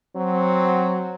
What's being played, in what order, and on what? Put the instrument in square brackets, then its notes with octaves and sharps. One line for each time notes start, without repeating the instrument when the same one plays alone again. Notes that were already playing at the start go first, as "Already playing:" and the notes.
[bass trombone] F#3 [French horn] C4